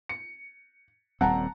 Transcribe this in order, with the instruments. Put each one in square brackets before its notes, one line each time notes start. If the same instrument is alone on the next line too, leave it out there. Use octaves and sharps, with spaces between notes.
[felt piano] C#7
[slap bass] D#1 G3 C4 [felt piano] F#5 A5 A#5